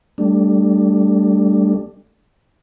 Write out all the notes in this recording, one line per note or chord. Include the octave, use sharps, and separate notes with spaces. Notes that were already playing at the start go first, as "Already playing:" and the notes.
G3 A3 D4